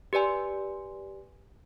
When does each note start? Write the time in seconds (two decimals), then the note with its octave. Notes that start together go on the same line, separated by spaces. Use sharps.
0.13 G4 B4 D5 G#5 C6